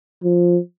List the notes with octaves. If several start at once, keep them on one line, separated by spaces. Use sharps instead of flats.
F3